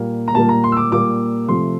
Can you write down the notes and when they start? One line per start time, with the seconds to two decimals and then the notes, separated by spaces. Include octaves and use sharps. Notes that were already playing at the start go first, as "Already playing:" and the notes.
Already playing: A#2 G3 A#3
0.28 A#5
0.34 A#2 G3 A#3 A5
0.49 A#5
0.64 C6
0.72 E6
0.77 D6
0.91 A#2 G3 A#3 D6
1.48 C3 F3 A3 C6